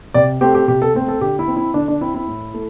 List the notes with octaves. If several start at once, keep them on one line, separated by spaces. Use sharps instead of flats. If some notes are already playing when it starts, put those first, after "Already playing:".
C3 D5
A3 C4 G4
G4
C3 G4
A4
A3 C4
A4
D3 G4
E4
C4
E4
D3 D4
D4
C4 E4
E4
A2
A3